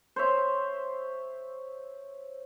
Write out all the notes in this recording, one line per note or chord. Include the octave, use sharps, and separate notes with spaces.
C5 C#5 E5